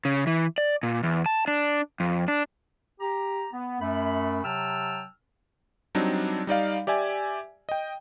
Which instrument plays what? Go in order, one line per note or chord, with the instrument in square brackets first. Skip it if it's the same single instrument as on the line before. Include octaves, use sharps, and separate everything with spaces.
[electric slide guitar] C#3
E3
D5
A#2
E2
A5
D4
F2
D4
[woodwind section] G4 A#5
B3
F#2 A3 B5
C3 F#3 G5 A5 E6 F6
[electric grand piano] F#3 G3 C4 D4 D#4
G3 D#4 D5 F5
G4 D5 E5 G#5
D#5 G5